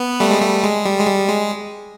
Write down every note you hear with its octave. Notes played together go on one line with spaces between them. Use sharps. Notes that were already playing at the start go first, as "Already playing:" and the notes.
Already playing: B3
G3 A3
G#3
G3 A3
G#3
G3
G#3
G3
G#3